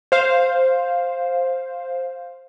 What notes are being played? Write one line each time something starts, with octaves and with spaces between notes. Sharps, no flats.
C5 F5